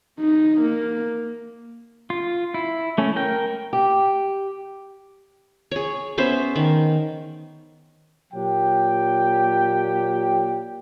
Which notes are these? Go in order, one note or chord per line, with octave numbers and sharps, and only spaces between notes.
D#4
A#3
F4
E4
A3 C#4
A#4 G5
G4
G#4 C#5
B3 C#4 C5 E5
D#3
A#2 F#3 G4 G5